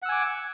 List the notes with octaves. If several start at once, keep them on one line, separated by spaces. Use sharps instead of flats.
F#5 G#5 D6 E6